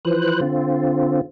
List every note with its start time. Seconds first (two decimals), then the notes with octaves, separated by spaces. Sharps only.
0.05 E3 F3 B4 C5 F#6
0.41 D3 C4 F4